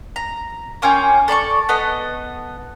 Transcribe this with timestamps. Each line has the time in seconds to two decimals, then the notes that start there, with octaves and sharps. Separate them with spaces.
0.16 A#5
0.82 A#3 C#4 F4 G5
1.28 A4 D5 C6 C#6
1.69 B3 A4 D#5